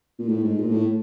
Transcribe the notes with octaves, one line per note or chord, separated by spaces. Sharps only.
A#2
A2
G#2
A#2
A2